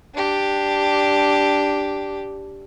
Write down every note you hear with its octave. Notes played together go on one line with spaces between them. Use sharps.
D4 G4